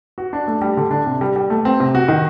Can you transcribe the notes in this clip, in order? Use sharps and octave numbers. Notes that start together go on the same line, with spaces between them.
F#4
D4
A3
G3
D3
D4
C3
G3
G3
A3
C4
C3
F#4
D#3